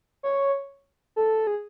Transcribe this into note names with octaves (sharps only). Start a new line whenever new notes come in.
C#5
A4
G#4